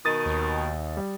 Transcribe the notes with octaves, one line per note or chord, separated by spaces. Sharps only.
B2 D#3 D#6 A6 D#7
D#2
G3